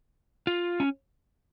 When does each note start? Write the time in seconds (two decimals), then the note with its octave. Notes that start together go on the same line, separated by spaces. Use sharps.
0.47 F4
0.80 C#4